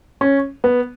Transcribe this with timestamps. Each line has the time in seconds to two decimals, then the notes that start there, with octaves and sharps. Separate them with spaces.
0.21 C#4
0.64 B3